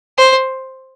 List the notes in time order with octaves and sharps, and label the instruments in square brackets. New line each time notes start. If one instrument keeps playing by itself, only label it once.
[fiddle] C5